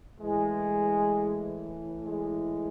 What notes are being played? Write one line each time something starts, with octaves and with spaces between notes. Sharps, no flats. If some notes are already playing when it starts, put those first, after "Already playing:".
A2 E3 G#3
G#3